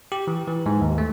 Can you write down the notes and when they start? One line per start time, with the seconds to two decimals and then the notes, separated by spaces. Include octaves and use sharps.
0.12 G4
0.27 E3
0.48 E3
0.66 G#2
0.81 D#2
0.98 A3